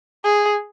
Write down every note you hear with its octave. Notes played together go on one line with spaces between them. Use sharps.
G#4